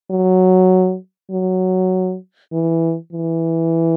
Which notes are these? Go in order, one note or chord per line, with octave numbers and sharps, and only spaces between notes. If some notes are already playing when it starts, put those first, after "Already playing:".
F#3
F#3
E3
E3